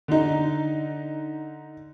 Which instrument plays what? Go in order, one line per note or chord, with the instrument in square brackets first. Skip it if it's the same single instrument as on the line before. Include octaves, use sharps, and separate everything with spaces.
[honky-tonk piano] D3 D#4